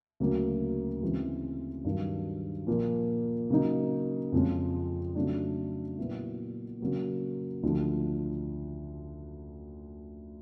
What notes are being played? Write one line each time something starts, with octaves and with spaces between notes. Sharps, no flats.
D2 C#3 F#3 A#3
D2 C#3 E3 G#3 C4
G2 D#3 F#3
A#2 F3 A#3
C#3 F#3 A#3 D#4
F2 C#3 F3 G#3 C#4
C#3 F#3 A3 D4
A#2 F#3 B3 E4
C#3 F#3 A#3
D2 D3 F3